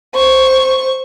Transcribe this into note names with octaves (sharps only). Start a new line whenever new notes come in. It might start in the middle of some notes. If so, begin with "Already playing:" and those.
C5 C#6